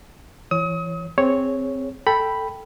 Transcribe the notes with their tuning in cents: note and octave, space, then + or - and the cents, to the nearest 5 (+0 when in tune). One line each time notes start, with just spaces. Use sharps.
E3 +30 C#5 +0 D#6 +35
C4 +0 G#4 +0 C#5 +0
A4 +10 G5 +0 B5 +0